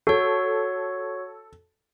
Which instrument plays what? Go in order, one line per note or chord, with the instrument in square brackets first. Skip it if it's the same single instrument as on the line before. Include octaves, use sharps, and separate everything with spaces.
[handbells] F#4 C#5 [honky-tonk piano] A4